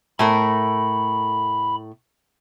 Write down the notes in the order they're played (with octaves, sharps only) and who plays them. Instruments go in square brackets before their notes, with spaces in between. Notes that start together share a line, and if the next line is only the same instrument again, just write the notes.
[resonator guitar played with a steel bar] A2 A3 A#4 [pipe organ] B5